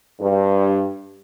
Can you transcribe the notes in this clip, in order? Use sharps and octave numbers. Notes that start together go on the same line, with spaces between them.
G2